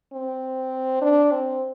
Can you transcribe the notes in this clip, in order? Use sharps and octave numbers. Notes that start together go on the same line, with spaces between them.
C4
D4
C4